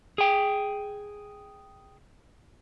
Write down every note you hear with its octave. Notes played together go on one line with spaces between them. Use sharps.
G#4 G5